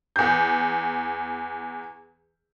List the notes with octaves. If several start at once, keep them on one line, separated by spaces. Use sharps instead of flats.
E2 G6